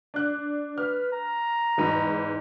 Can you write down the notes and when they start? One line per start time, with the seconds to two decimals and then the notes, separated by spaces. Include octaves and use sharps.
0.14 D4 F#6
0.78 B4 F6
1.12 A#5
1.78 E2 G#2 B5